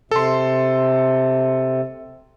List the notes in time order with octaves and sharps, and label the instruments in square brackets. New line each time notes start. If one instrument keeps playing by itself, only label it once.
[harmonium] C3 [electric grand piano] A4 C6